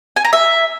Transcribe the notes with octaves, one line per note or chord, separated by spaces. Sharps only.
G#5
A#5
E5